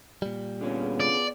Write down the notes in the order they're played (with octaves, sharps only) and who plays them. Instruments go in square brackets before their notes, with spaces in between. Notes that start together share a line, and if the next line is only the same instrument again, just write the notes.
[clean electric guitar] A#2 G3
[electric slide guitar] D3 C#4 [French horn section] B3 F4 G#4
[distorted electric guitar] D5